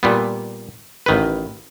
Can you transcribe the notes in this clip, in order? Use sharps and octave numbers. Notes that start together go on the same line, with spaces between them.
A#2 G3 B3
A1 D#3 B4